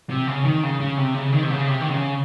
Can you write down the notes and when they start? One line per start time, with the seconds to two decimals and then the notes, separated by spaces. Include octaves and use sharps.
0.10 C3
0.27 C#3
0.45 D#3
0.63 C#3
0.80 C#3
0.97 C3
1.14 C#3
1.32 D#3
1.43 C3
1.50 C#3
1.67 C3
1.81 D#3
1.91 C#3